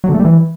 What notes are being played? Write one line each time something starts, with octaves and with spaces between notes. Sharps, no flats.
F#3
D3
A3
G3
E3